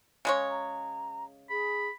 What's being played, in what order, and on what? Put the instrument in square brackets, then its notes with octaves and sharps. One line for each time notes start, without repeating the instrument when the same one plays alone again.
[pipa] C#3 G#3 C#5
[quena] A#5
[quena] G#4 [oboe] B5